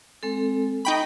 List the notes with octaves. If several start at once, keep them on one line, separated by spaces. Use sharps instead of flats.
G#3 C4 A4
D#4 G5 B5 C#6